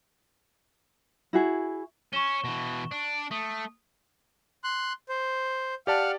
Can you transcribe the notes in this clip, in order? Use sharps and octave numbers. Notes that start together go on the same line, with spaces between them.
E4 F#4 G#4
C#4 C#6 E7 G7
B2 E3
D4
A3 D#6
C6 F#6
C5
G4 D5 F5 F#5 A5 F6